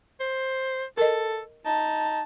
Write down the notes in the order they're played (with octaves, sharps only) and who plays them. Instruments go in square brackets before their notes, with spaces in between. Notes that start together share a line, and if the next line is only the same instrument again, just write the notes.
[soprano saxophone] C5
[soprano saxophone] A4 [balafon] A#4 D#5
[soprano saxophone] D#4 [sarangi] A5